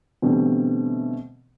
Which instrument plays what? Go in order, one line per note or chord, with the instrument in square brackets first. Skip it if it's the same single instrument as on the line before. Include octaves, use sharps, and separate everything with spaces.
[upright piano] B2 D3 E3 G3 A3 C4